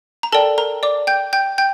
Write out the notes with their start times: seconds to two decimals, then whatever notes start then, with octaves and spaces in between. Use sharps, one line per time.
0.23 A#5
0.32 A4 A#4 D5 G5 A5
0.58 A#4 A#5
0.83 D5 D6
1.07 G5 G6
1.33 G5 G6
1.58 G5 G6